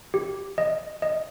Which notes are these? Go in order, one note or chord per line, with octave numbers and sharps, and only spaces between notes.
G4
D#5
D#5